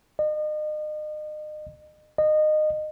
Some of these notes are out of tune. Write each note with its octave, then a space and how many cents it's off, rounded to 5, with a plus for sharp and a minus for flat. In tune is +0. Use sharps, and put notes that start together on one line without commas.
D#5 -35
D#5 -20